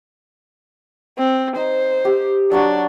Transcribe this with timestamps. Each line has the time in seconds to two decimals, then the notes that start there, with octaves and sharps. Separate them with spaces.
1.18 C4
1.56 D#4 C5
2.05 G4
2.52 F#3 D4 C#5 F#5